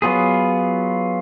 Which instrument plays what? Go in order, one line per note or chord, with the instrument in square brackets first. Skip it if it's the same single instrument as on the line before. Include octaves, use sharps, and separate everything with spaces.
[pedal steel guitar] F#3 B3 F4 G#4